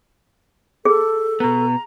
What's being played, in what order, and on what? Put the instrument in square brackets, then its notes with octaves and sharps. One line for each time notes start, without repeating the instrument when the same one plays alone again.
[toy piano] G#4 [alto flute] A4
[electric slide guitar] B2 B3 [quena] A#5